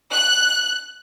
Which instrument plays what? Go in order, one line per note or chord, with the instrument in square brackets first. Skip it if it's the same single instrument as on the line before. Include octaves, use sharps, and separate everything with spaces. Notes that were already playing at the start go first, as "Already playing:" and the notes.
[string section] F#6